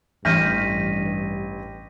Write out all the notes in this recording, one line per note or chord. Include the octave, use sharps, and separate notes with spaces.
A1 G2 E3 F6 G6 A#6 B6 D#7